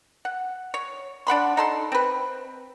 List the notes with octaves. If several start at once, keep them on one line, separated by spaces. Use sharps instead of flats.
F#5
C#5
D4 F#5 B5 C6
D#4 A4 C6
C4 B4